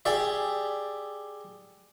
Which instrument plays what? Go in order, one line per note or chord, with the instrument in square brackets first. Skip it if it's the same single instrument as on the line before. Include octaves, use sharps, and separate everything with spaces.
[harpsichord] G4 G#4 D5 E5